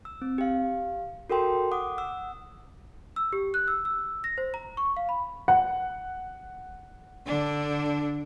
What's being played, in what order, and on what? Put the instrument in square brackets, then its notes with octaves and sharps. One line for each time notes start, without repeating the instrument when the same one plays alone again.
[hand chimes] E6
C4
G4 F5
F#4 A4 A#4 G5 C6
F#5 D6 D#6
F#5 E6
[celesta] E6
G4
F#6
E6
E6
A#6
C5
A#5
C#6
F5
B5
[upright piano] F#5
[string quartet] D3 D4